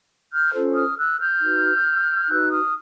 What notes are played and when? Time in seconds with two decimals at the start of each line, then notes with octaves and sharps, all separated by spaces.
0.32 F6 G6
0.53 C#4 F4 A4 C5
0.75 D#6 F6
0.98 E6 F#6
1.19 F6 G6
1.40 D#4 F#4 B4
2.28 D#4 F#4 B4 E6 F#6
2.51 D#6 F6